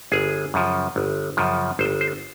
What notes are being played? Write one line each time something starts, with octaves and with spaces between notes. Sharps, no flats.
G1 G#4
F#2 C#3 F3
G1
F#2 C#3 F3
G1 C5
C5